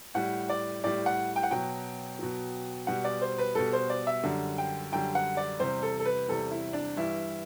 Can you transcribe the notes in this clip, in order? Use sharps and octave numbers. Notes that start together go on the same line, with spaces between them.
A2 G3 F#5
D5
A2 G3 D5
F#5
G5
F#5
B2 F#3 G5
B2 F#3
B2 G3 F#5
D5
C5
B4
B2 G3 A4
C5
D5
E5
F#2 D3 G3
G5
F#2 D3 G3 G5
F#5
D5
E2 C3 G3 C5
A4
A4
B4
E2 C3 G3 A4
E4
D4
G2 E3 G3 E4